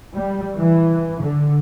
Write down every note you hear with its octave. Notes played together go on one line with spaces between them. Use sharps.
G3
E3
D3